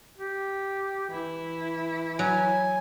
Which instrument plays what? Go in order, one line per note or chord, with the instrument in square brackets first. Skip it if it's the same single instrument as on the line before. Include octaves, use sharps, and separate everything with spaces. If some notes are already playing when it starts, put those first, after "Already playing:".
[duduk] G4
[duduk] E3 [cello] E4
[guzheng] F#3 [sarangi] G#5